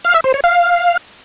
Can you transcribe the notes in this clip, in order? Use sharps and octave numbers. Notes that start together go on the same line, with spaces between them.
F5
E5
C5
C#5
F5